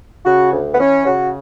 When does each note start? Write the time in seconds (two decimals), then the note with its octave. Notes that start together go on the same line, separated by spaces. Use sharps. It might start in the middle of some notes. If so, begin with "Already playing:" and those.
0.24 C#3 F#4
0.51 D2
0.73 B3
0.79 E3 C#4
1.06 C#3 F#4